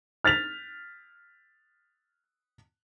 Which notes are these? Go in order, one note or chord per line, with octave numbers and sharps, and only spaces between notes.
F6 A6 B6 F7